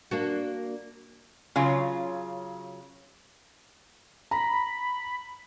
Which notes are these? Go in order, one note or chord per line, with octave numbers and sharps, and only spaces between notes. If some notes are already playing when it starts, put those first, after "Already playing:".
A#3 D4 F#4
C#3 F#3 F4
A#5 B5